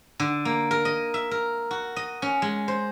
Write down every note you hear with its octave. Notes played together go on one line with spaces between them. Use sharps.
D3
A#3
A#4
D#5
E5
A#4
F#4
D#5
C#4
G#3
C5